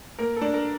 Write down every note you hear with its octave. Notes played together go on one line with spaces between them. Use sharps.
A#3 A#4
A4
D4
A#4